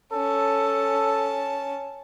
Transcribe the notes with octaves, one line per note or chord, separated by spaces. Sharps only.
C#4 A4 A5